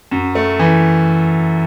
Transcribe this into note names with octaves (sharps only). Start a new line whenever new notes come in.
F#2
A3
E3